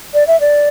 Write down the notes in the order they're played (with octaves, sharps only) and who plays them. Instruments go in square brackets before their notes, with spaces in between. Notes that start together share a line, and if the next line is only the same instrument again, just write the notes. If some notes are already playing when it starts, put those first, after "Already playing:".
[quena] D5
E5
D5